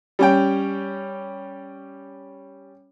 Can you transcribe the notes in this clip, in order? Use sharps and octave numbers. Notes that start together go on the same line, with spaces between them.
G3 C#4 G5